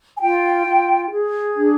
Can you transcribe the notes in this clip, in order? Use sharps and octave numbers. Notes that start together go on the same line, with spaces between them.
G#5
F4 G5
F4
G#4
D4